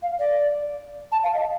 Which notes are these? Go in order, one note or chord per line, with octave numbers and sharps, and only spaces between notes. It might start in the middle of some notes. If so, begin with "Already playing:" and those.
F5
D5
A5
F5
D#5